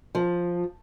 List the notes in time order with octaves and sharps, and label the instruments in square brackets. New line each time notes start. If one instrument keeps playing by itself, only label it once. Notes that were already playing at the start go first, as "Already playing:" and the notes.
[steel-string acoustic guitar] F3